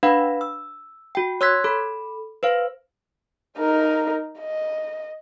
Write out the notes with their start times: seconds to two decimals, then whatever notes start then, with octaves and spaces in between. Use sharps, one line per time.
0.03 D4 B4 F5 F#5 B5
0.41 E6
1.15 F#4 G5
1.41 C#5 C6 E6 F#6 G#6 B6
1.64 A4 B5
2.43 B4 C5 F5
3.58 D#4 A#4
4.39 D#5